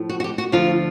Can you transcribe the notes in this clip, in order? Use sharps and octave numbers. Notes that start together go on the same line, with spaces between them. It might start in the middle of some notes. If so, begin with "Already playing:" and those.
Already playing: A2 F3
F#4
F#4
G4
F#4
D2 D3 F3 F4